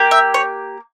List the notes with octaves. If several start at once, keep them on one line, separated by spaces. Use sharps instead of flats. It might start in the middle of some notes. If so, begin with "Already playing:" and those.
Already playing: A#3 G4
E5
C#5